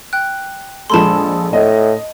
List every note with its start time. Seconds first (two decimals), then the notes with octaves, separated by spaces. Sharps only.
0.13 G5 F#6
0.90 A#1 G#3 A4 A5 B5 C6
1.53 A2 D#5